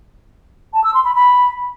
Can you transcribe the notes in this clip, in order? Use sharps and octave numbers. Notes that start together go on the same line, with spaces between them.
A5
E6
C6
B5
B5